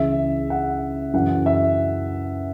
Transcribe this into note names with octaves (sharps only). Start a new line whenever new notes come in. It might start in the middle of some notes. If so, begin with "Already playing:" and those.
Already playing: C#2 C#3 E3 E5
F#5
F#2 C#3 E3 F#5
E5